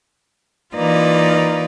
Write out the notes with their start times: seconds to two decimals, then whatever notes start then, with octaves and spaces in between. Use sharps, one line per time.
0.75 E3 A#3 D#4 F4 B4 D5